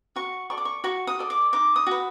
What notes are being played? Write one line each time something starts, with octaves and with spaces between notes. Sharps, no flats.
F#4 C#6
A4 D5 C#6
D6
C#6
F#4 C#6
D#6
A4 D5
D6
D#4 D6
D#6
F#4 B4